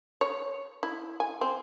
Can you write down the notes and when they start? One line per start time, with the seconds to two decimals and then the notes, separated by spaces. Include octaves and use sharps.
0.21 C#5
0.83 E4
1.20 G#5
1.41 C4